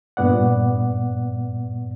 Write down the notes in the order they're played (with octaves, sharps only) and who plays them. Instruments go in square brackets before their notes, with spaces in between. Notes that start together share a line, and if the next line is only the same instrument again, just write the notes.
[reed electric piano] G2 A#2 B3 D5 F#5